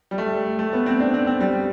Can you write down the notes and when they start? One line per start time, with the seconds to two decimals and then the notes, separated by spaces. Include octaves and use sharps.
0.11 G3
0.18 A3
0.59 A3
0.73 B3
0.86 C4
1.00 D4
1.14 C4
1.27 C4
1.41 G3